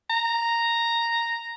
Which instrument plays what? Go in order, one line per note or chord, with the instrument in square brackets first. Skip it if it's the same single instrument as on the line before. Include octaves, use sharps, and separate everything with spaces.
[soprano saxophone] A#5